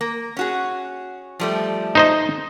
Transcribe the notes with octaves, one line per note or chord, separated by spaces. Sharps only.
A#3
C#4 F#4 G#4
F3 G3 A3
D#4 C5 D#5